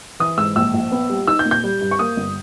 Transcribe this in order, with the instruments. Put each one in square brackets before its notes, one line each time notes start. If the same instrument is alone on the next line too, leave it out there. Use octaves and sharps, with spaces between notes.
[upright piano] E3 D#6
G#2 E6
A#1 E6
A#1
B3
G3
D#4 E6
G6
A#2
G6
G3
G2
C#6
A#3 D#6
G1